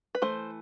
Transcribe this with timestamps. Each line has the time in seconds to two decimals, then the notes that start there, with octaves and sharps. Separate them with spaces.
0.15 B4
0.22 E3 A3 C5